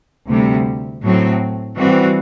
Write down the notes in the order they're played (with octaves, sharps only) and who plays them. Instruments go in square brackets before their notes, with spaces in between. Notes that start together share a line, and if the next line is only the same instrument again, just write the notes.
[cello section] D2 C3 G3
A2 F#3 C4
E3 G3 C4 F#4